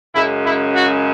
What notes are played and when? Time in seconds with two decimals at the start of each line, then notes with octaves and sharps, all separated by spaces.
0.14 F#2 C#3 G#3 E4
0.45 E4
0.75 F#4